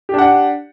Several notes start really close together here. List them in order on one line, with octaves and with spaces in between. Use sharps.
G4 D4 F#5